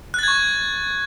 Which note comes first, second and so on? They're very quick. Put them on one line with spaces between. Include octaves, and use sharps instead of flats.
F#6 A6 G#6 C#6